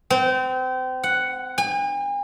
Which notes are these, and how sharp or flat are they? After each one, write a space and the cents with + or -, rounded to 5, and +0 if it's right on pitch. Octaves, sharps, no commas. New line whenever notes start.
C4 -30
F#5 +5
G#5 -45